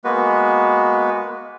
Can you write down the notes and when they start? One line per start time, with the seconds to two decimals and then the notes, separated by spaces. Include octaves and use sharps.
0.04 G#3 A#3 B3 F#4 B4